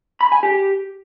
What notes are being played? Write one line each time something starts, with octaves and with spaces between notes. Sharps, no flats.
B5
G#5
G4